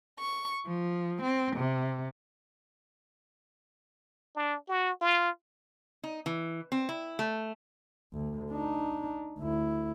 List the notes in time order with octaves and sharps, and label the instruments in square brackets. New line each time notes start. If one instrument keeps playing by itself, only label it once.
[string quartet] C#6
F3
C4
C3
[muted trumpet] D4
F#4
F4
[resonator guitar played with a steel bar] D#4
E3
C4
E4
A3
[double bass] D2
D4 D#4
D2 E4